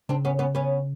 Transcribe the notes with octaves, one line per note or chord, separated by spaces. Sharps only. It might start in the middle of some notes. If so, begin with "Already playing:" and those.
C#3 C4 D4
B3 C#4
B3 C#4
B3 C#4